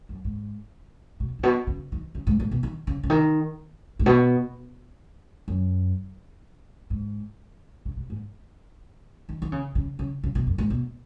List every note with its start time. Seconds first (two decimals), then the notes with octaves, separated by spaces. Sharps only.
0.09 F#2
0.25 G#2
1.20 B2
1.39 G#2
1.43 B2
1.67 C#3
1.92 D#3
2.15 C#3
2.27 G#2
2.40 G#2
2.51 B2
2.63 D#3
2.87 C#3
3.03 C#3
3.10 D#3
3.99 G#2
4.06 B2
5.48 F#2
6.90 G#2
7.85 C#3
7.97 B2
8.10 G#2
9.29 D#3
9.42 D#3
9.52 C#3
9.75 C#3
9.99 C#3
10.24 C#3
10.35 B2
10.47 F#2
10.58 G#2
10.70 B2